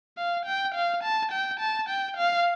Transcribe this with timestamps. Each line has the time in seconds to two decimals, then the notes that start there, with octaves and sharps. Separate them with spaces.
0.18 F5
0.46 G5
0.75 F5
1.03 A5
1.32 G5
1.60 A5
1.89 G5
2.17 F5